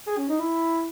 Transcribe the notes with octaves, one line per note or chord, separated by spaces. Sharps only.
G#4
C#4
D#4
E4